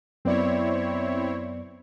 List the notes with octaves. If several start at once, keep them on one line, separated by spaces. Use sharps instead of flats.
F#2 B3 C4 E4 C#5 D5